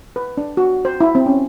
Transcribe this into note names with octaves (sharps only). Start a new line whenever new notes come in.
B4
D4
F#4
C5
E4
C4
C#4